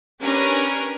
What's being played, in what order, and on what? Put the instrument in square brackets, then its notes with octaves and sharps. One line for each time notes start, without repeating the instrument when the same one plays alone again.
[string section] C#4 D4 G4 A#4 B4 G#5